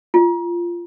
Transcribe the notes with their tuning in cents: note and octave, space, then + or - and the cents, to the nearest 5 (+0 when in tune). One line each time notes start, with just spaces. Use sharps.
F4 -15